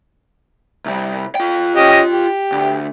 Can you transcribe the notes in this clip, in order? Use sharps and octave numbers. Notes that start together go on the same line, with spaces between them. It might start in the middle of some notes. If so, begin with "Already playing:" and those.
C2 G3
F4 G5
C#4 G4 D#5
G4
D2